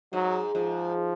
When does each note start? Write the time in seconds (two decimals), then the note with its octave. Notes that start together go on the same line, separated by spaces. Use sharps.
0.13 G#2 F#3
0.55 G#2 F3